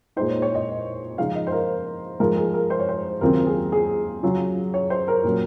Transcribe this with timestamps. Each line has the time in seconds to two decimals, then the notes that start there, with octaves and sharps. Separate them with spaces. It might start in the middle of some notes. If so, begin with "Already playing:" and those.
0.16 A#2 G#3 D#4 C5
0.29 C#5
0.42 C#5
0.55 D#5
1.18 C#3 F3 G#3 D#4 F5
1.35 D#5
1.47 C5
1.52 A#4
2.20 G#2 F3 G#3 A#4
2.37 G#4
2.54 A#4
2.70 C5
2.79 C#5
2.89 C5
3.21 D#2 C#3 F#3 C4 F4 A#4
3.47 G#4
3.72 G#4
4.23 C#3 F#3 C#4 F4
4.74 C#5
4.90 C5
5.08 A#4
5.24 A#2 F#3 C#4